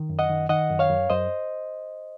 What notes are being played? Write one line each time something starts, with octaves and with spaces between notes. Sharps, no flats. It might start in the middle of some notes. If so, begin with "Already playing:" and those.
Already playing: D#3
F#2
D#5 F#5
D#3
D#3 D#5 F#5
F#2
C#5 F5
F#2
F#2 C5 D#5